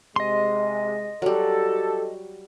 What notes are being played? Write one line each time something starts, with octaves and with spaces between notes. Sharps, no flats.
C3 G#3 D#5 C6
F#3 G3 G4 A4